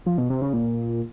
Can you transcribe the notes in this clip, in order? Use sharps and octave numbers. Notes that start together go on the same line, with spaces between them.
F3
B2
C3
C#3
A#2